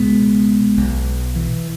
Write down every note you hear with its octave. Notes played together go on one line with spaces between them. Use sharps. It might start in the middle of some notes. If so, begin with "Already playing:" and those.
Already playing: C#2 B2 G#3 B3
B1 B2
E3